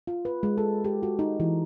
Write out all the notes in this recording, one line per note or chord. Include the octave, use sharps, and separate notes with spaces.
F4
B4
G#3
A4
G4
F#4
D#4
E3